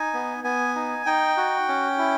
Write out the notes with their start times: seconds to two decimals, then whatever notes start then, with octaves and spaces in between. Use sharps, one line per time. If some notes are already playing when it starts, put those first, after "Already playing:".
Already playing: D#4 G#5
0.14 B3
0.44 B3 G#5
0.76 D#4
1.06 D#4 G5
1.37 F#4
1.68 C#4
1.98 E4